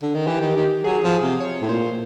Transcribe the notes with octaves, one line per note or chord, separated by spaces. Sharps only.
D3
D#3
E3 G4
D#3
D#3
F#3 G#4
F3
C3
C#5
A2
A#2 C5